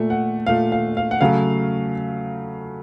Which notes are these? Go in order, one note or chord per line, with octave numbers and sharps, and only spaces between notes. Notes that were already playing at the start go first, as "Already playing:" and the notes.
Already playing: A#2 A3
F#5
A#2 A3 F5
F5
F5
F#5
C#3 F#3 A3 F5